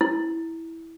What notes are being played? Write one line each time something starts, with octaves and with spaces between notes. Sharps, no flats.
E4